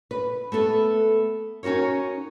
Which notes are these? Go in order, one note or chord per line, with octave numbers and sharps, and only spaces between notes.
B4
A3 B3 A4 B4
C#4 D#4 F#4 A#4 C#5